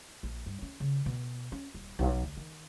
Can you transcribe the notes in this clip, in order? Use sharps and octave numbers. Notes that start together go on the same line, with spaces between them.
A#1
G2
C#4
C#3
B2
C#4
D#1
B1
D2
D#3